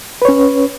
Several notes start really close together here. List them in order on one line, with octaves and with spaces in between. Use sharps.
B4 C#5 C#4